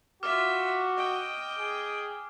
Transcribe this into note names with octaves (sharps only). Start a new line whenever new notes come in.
F4 F#4 E5 D6 F6
D#5 G5
G#4